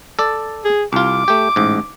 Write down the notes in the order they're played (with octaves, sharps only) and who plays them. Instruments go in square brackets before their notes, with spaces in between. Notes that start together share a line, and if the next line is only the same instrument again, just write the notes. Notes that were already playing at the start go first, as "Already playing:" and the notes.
[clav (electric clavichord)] A4 D5
[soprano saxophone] G#4
[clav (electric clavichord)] C2 F4 [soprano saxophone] D6
[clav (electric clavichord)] A3 G4
A1 G#2